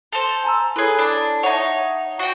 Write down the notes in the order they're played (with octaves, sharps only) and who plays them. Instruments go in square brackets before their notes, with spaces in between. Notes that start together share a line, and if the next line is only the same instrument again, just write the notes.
[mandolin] A4 C5 [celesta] F7
[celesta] G#5 A#5 E6
[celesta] E4 A4 C#5 [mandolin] G#4 B4
[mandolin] D4
[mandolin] D#4 C#5 [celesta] E5 F#5
[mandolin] F#4 G5